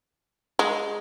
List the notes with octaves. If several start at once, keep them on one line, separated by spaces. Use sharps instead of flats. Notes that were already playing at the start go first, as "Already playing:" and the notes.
G#3